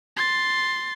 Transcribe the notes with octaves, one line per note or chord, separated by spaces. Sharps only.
C6 A6